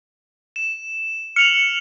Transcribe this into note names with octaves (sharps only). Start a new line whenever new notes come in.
E7
F6 C#7 F7 F#7